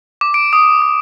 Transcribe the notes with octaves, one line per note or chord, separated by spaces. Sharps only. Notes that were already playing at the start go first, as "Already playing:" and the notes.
D6
D7
D#6
D#6